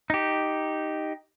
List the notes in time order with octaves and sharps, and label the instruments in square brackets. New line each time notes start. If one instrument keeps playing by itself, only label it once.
[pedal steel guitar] D#4 G4